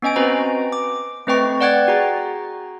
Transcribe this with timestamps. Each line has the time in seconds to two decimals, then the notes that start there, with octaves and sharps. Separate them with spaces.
0.02 B3 C#4 D#5 G#5 D7
0.16 C4 F#4 B4 C5 D#5 A#5
0.72 D6
1.27 A3 C4 B4 D#5 G5 C#6
1.61 D5 F#5 G5 F#6 G#6 A6
1.88 F#4 G#4 A#5